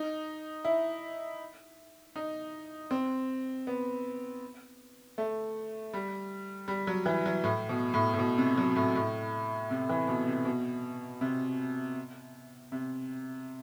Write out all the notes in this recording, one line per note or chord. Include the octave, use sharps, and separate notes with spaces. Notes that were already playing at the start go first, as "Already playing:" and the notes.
Already playing: D#4
E4
D#4
C4
B3
A3
G3
G3
F#3
E3
F#3
A2
B2
A2
A2
B2
C3
F#3
A2
A2
C3
E3
B2
C3
B2
C3
C3